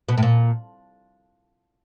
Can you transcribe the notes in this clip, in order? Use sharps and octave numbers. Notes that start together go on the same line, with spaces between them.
B2
A2
A#2